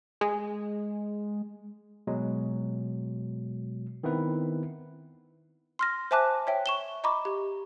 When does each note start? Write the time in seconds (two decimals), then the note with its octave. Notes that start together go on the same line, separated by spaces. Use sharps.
0.21 G#3
2.07 B2 F#3 G#3
4.03 D#3 B3 C4 E4 B4
5.79 C6 F6 A#6
6.11 C5 E5 G#5 A5 D6 F#6
6.47 C#5 E5 G5
6.66 C#6 E7 G7
7.04 D#5 A#5 B5 C#6 D6
7.25 G4